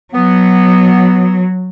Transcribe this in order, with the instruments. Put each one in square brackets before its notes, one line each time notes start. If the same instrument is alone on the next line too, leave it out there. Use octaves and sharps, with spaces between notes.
[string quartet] F#3 [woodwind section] B3